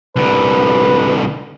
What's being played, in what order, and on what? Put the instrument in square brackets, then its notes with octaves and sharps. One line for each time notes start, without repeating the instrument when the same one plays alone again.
[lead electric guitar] C2 D3 [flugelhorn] B4